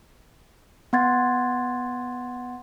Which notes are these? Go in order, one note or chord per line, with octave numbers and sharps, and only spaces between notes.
B3 F#5 C6 G#6 A6